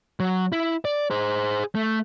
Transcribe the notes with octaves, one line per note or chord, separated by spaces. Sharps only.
F#3
E4
D5
G#4 C5
A3